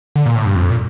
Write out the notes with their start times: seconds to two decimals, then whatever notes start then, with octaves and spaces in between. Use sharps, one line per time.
0.16 D3
0.26 A#2
0.35 A2
0.46 G2
0.55 F2
0.70 A#2